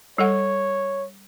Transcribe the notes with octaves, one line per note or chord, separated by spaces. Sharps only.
G3 A4 C#5 F#5